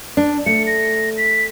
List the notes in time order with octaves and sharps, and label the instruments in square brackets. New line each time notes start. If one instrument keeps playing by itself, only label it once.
[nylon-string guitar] D4
[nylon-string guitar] A3 [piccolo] C#7
[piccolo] A#6
B6